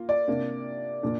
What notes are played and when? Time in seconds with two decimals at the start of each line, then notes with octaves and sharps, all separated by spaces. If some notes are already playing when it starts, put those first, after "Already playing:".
Already playing: A#3 F4
0.09 D5
0.28 C3 A#3 D4
1.03 A#2 A#3 D4